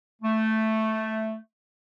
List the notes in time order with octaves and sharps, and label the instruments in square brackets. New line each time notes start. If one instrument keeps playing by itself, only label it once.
[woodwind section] A3